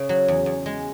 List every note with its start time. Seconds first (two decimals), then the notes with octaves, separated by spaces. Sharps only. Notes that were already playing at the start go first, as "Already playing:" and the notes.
Already playing: C#3
0.09 F#3
0.28 E2
0.46 E2
0.66 G#3